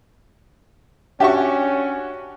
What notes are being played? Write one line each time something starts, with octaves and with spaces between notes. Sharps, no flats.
C#4 D4 F#4 G4 E5 C#6